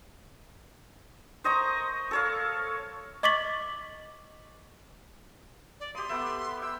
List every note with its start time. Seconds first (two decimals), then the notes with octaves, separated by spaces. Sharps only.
1.44 C5 D#5 A#5 C#6
2.11 A4 C#5 F5
3.23 D#5 C#6 D6 A6 B6 F#7
5.80 D5
5.95 G4 C6 D#6
6.09 A3 B3 E5
6.62 G5 E6